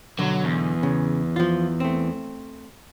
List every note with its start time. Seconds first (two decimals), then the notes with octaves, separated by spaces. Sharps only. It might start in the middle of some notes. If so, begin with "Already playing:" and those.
0.19 B1 D3 F#3
0.44 E2
0.83 C#3
1.36 F3 F4
1.80 A3 C4